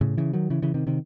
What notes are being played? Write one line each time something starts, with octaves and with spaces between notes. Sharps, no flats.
A2 C#3
C#3 E3
D#3 F#3
C#3 E3
C#3 E3
C3 D#3
C3 D#3